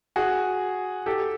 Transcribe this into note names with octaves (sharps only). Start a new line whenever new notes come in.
F#4 G#4
G4 A4